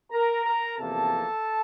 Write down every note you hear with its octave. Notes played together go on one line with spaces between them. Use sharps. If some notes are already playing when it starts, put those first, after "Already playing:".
A#4 A#5
A#4 A#5
E2 C3 F3 A#3 A4 A5